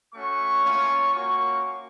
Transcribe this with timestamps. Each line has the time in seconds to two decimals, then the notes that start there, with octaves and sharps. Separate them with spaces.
0.13 A3 C#4 F#4 C#6
0.63 A#3 C#4 F4
1.13 A#3 C#4 F#4 C#6